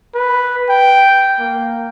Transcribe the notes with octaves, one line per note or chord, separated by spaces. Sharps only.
B4
G5
A#3